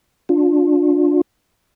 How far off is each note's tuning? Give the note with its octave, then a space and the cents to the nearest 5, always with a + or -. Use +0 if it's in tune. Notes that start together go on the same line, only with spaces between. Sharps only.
D4 +0 F4 +30